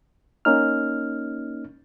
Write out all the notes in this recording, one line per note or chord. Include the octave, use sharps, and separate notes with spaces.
A#3 C#4 D#4 F6